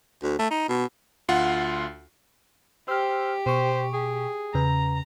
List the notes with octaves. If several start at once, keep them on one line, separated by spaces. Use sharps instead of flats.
D2
A3
D#4
B2
D2 F4 F#5
G4 C5 E6 F6
B2 C5 C#6
G#4
E2 C#3 B4 A#5